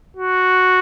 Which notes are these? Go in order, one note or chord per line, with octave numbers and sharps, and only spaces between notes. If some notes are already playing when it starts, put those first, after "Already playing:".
F#4